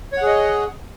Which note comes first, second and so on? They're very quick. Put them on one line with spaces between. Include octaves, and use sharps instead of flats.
C#5 F#5 G#4 D#5